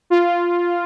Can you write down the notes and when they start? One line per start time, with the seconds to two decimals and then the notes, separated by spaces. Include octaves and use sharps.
0.10 F4